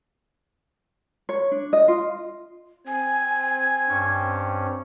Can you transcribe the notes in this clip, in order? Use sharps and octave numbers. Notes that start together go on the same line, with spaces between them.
C#5
D4
D#5
F4
C4 G#5 G#6
G2 C#4